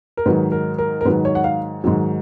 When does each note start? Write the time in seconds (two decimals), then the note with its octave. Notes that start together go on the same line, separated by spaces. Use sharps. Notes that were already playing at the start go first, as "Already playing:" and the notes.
0.17 A#4
0.26 G#2 D#3 F#3 B4
0.52 A#4
0.78 A#4
1.01 A#4
1.05 G#2 D#3 F#3 B4
1.25 C#5
1.35 F#5
1.44 F5
1.84 G#2 D#3 F#3